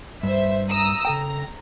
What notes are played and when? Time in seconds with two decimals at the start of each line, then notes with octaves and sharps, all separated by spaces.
0.23 G2 C5 E5
0.71 A#5 D#6 E6
1.05 C#3 A4 G5 A#5